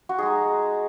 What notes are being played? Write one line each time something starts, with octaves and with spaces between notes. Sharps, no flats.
F#4
G#3 D#4 G#4